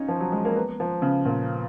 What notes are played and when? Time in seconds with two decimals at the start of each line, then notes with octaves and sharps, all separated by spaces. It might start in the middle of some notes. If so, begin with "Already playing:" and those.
Already playing: C#4 D#4 F4
0.08 F3
0.20 F#3
0.32 G#3
0.45 A#3
0.56 B3
0.80 F3
1.02 C#3
1.25 A#2